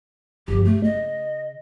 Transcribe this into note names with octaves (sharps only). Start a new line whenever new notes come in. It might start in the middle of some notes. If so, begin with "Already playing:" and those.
G1 F3 G4
C#3 A3
D#5